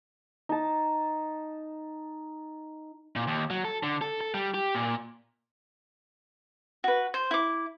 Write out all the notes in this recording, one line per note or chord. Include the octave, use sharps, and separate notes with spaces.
D#4 A5
A#2
D#2
F#3
A4
D3
A4
A4
G3
G4
A#2
F#4 B4
C5
E4 D6